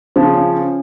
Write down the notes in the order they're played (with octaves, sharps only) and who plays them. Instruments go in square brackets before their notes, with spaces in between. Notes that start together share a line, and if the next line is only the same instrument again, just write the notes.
[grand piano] C#3 F3 [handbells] C5
[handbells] C#4
C#4